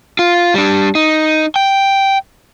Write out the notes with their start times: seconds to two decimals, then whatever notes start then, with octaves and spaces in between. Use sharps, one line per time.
0.19 F4
0.54 G3 D4
0.95 D#4
1.56 G5